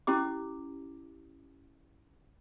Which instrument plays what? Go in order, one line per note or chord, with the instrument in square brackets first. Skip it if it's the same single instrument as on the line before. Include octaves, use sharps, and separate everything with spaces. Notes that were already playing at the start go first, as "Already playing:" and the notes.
[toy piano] C#4 E4 G4 D6